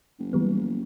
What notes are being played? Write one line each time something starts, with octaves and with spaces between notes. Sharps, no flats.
F#1
E3 G3 B3